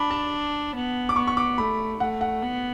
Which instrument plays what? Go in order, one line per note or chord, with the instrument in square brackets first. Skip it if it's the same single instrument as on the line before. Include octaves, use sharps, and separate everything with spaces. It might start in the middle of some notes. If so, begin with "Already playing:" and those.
Already playing: [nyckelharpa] D4 [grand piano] B5
[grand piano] A5
[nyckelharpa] B3
[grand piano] D6
[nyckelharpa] B3 [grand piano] C#6
[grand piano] C#6
D6
[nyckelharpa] A3 [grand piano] B5
[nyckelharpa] A3 [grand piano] F#5
[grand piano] F#5
[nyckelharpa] B3